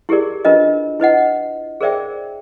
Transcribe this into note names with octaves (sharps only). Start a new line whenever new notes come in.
E4 G4 G#4 A#4 D5
D4 F4 A#4 B4 D#5
E4 B4 D#5 F#5
G#4 A#4 C5 D5 E5 G5